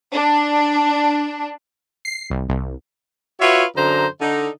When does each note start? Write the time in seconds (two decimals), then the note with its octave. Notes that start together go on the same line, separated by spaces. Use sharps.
0.12 D4
2.05 C7
2.30 C2
2.49 C2
3.41 F4 F#4 B4 C#5 E5
3.76 F#2 D3 C5 A#5
4.21 D3 D#4